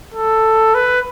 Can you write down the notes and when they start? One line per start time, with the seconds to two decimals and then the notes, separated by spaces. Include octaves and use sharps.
0.14 A4
0.75 B4